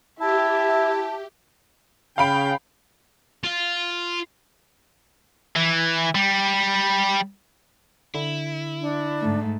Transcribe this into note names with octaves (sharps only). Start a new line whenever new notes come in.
E4 G4 E5 A5
C#3 F5 G5 B5 D7
F4
E3
G3
D3 E4
D4
G#2 A3